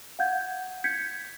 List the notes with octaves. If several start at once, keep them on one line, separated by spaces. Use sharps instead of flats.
F5 F#5 G6 G#6
G6 G#6 B6 C#7